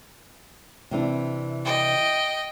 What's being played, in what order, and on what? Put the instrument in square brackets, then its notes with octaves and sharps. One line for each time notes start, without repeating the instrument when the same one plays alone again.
[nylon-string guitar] C3 E3 D4
[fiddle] D#5 G5